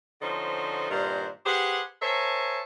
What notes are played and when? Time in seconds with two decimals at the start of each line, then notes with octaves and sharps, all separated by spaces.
0.22 D3 F3 C#4 D#4 F#4 C5
0.90 G2 A#2 D#3 A#4 C5 F#5
1.46 G4 G#4 B4 C5 F#5
2.02 A#4 C5 C#5 E5 G#5 A5